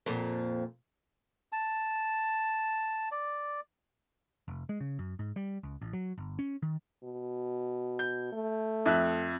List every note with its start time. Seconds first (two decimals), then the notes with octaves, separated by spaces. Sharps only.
0.06 F2 A#2
1.52 A5
3.12 D5
4.48 F1
4.69 G#3
4.80 C#3
4.99 F#2
5.19 G#2
5.36 G3
5.63 C#2
5.81 A1
5.93 F#3
6.18 G1
6.39 C#4
6.62 D#3
7.04 B2
7.99 G6
8.33 A3
8.86 F2 E5 F#6